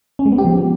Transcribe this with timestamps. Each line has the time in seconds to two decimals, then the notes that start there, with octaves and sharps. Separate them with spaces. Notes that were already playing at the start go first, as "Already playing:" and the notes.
0.19 C#4
0.26 G#3
0.32 B3
0.38 G4
0.45 F3